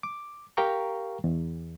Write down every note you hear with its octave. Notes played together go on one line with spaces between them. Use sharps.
D6
G4 A#4 F5 G5 A#5 C#6
E2